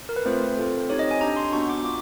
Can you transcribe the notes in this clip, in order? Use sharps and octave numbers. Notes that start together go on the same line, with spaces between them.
A#4
B4
A3 C4 F4 C5
C4 F4 A4
C4 D#4 G4 C#5
D#5
G#5
D4 G4 A#5
C6
B3 D4 F#4 C#6
D6
F4 D6